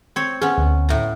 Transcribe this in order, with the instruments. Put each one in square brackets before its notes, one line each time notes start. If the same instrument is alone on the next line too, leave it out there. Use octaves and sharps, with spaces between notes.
[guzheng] C4 C#5
[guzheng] B3 C#4 [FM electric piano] G#4
[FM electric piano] D2
[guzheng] A2 A#5